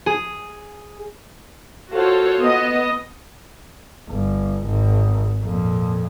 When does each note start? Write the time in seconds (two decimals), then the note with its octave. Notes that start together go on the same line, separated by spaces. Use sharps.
0.06 G#4
1.92 F4 F#4 A4 C5 C#5
2.41 B3 D#5
4.09 G1
4.66 G#1
5.43 F2 A#2